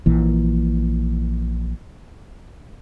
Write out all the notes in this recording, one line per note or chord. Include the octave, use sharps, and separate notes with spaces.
A#1 A#2 E3